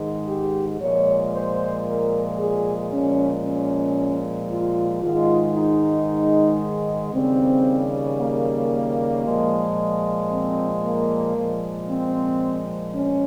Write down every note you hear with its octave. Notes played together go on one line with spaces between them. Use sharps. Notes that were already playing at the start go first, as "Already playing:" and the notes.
Already playing: G#2 D#3 G#3
G4
A#2 F3 G#3 C#5
C5
A#4
G#4
A#2 F3 G#3 C#4
C#4
F4
G#2 D#3 G#3 F4
D#4
D#2 C#3 G3 C4
A#3
A#2 F3 G#3
C4
A#3
A#2 F3 G#3
C4
C#4